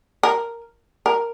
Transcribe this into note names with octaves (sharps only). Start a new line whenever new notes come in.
A#4
A#4